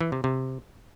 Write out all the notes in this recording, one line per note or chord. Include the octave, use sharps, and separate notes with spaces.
E3
C3
C3